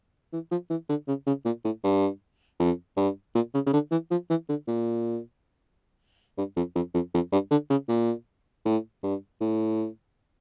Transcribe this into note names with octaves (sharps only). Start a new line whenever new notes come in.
E3
F3
E3
D3
C#3
C#3
A#2
A2
G2
F2
G2
A#2
C#3
C#3
D3
E3
F3
E3
D3
A#2
G2
F2
F2
F2
F2
G2
D3
C#3
A#2
A2
G2
A2